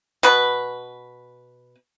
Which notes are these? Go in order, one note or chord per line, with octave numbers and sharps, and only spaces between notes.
B2 B4